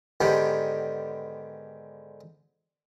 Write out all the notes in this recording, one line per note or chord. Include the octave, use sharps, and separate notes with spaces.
G#2 D3 D#3 B3 G4